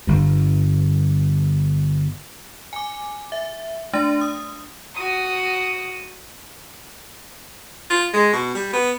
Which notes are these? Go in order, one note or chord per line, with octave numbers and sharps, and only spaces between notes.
G1 G2
G#5 D6
E5
A3 D4 A6
D#6
F#4 D#6
F4
G#3
B2
G3
B3